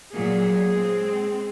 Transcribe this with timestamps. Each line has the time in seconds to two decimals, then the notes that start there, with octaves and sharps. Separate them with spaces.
0.13 A#2 F#3 A#3 G#4
0.71 G#3 C4